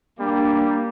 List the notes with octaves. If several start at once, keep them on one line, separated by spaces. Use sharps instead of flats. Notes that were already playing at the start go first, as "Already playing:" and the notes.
G3 A#3 D4